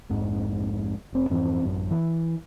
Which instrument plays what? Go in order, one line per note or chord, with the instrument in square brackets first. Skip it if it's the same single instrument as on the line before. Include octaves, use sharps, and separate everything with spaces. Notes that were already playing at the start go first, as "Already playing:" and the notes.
[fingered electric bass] A#1 F2 G#2
F1 C4
F2 G#2 E3 C4
A1 F#2
E3